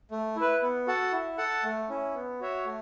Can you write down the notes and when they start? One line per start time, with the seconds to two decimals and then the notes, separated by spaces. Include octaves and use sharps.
0.11 A3
0.36 E4 B4
0.62 B3
0.87 F#4 A4 F#5 A5
1.12 E4
1.38 A4 F#5 A5
1.63 A3
1.89 C#4 E4
2.15 B3
2.40 F#4 C#5 E5
2.65 A3